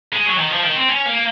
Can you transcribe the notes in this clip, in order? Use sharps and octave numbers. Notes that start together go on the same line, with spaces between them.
G#3
F#3
D#3
F3
D#3
C4
C#4
A#3